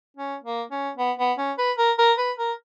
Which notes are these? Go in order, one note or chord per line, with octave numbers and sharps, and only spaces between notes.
C#4
A#3
C#4
B3
B3
C#4
B4
A#4
A#4
B4
A#4